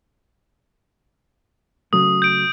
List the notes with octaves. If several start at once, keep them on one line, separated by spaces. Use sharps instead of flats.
C#3 F#3 A3 D#6
G6 D7